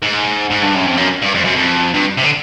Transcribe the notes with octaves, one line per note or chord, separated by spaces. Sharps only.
G#2
G#2
G2
F#2
F2
F#2
G2
F2
F#2
F2
G2
C3
D3